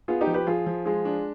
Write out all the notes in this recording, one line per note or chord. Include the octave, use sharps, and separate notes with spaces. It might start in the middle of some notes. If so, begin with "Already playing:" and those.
B3 F4 G#4
D#4 G4
F3
G4 B4
F3 F4 G#4
F3
G#3 F4 G#4
D4